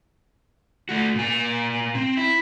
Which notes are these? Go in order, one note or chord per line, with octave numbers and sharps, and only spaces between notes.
A3 F#4
A#2 G#5
C4
E4